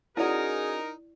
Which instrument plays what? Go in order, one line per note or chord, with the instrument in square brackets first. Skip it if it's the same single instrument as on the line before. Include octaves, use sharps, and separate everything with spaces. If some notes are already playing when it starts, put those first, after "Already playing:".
[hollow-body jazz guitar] C#4 F#4 [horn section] D#4 A#4 [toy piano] E4 D5 [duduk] G#4